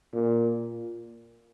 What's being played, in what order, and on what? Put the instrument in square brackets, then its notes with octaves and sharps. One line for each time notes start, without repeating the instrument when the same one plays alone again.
[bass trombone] A#2